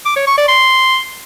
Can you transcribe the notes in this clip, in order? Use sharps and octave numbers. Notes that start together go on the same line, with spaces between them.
D6
C#5
C#6
D5
C6